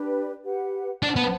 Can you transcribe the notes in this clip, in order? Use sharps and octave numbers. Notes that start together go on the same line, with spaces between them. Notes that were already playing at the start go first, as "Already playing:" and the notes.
Already playing: D4 G4 B4
G4 B4 F#5
D4 C5 F#5 A5
B3